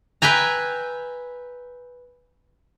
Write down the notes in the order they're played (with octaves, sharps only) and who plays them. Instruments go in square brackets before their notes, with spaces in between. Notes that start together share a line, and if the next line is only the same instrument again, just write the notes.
[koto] B4 E5 G5 G#5 A#5